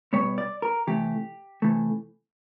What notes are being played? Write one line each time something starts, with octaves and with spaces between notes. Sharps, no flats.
B2 G3 B3 C#5
D5
A#4
C3 E3 A3 G4
C3 E3 A3